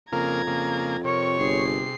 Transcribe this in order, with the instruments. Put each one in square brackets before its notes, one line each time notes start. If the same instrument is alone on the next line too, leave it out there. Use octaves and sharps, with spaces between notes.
[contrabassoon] F2 [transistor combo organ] C#3 A#3 A#4 [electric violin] A#5 G#6
[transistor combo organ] C#3 A#3
[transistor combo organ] C3 [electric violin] A#4 C#6 [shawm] C#5
[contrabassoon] G1 [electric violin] G#4 C7